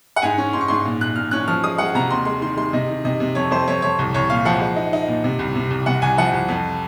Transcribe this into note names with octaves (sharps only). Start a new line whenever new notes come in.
F#5
G#2 G#5
C#4
G#2 C6
C#6
G#2 C6
A#2
A#2 F#6
A#2 F6
C#4 F#6
F3 F6
G#3 D#6
G#3 F#5
C3 A#5
D#2 C6
G#3 C6
D#3 C6
G#3 C6
C3 D#5
D#3
C3 D#5
C3
F2 C#5
F2 C5
F2 C#5
F2 C#5
C2
C2 C#5
A#2 F5
F3 F#5
G#3
D#4
D#4
A#2
C3
C2
C3
C2
C3 F#5
C2 G#5
F3 F#5
C2
F2